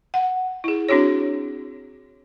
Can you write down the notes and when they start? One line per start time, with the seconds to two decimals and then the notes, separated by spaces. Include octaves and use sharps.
0.14 F#5
0.64 E4 G#4
0.89 C4 D4 F#4 G#4 C#5